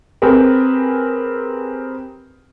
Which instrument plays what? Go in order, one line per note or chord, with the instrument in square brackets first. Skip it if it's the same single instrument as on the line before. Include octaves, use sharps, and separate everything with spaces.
[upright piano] C4 G4 G#4 A#4 B4